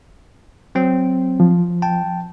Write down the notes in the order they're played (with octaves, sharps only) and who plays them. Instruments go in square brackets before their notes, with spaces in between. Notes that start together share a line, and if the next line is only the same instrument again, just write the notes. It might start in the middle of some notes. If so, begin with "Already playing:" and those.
[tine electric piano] F#3 C4
[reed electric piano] F3
[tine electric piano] G5 A5